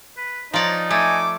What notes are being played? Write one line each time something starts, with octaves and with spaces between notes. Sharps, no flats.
B4
F3 D#4 C#5 D5 A#5
A3 G#5 D6